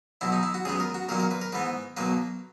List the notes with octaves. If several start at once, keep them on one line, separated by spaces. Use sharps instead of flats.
B1 B2 F#3 E4
D#4
E4
F#4
C#2 C#3 F#3 B3 G#4
A#4
F#4
B1 A#2 F#3 A#3 C#4 A#4
A#4
B4
A#4
G#2 E3 B3 B4
B1 B2 F#3 A#3 B4